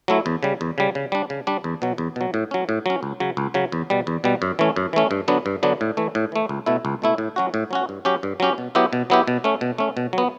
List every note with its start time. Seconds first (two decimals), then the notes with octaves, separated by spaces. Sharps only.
0.08 F#3 A3 E4
0.26 E2
0.43 C#3 G3
0.61 E2
0.78 C#3 G3
0.95 C#3
1.12 G3 D4
1.30 C#3
1.47 G3 D4
1.64 E2
1.82 B2 F#3
1.98 E2
2.16 B2 F#3
2.34 A2
2.51 F#3 C#4
2.69 A2
2.86 F#3 C#4
3.03 C#2
3.20 C#3 F#3
3.37 C#2
3.54 C#3 F#3
3.72 E2
3.90 B2 G3
4.07 E2
4.24 B2 G3
4.42 F#2
4.59 E3 A3 C#4
4.76 F#2
4.93 E3 A3 C#4
5.11 G2
5.28 D3 F#3 B3 D4
5.46 G2
5.63 D3 F#3 B3 D4
5.81 A2
5.97 E3 A3
6.15 A2
6.32 E3 A3
6.49 C#2
6.66 B2 A3 E4
6.85 C#2
7.02 B2 A3 E4
7.18 A2
7.36 F#3 C#4 F#4
7.54 A2
7.71 F#3 C#4 F#4
7.89 G2
8.05 F#3 C#4 G4
8.23 G2
8.40 F#3 C#4 G4
8.58 B2
8.75 F#3 B3 E4 G4
8.93 B2
9.10 F#3 B3 E4 G4
9.28 B2
9.44 A3 C#4
9.61 B2
9.78 A3 C#4
9.97 B2
10.13 F#3 B3